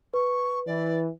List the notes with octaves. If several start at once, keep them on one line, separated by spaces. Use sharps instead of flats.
B4 C#6
E3 D5